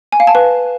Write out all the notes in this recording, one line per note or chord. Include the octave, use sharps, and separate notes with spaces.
G#5
F5
A5
B4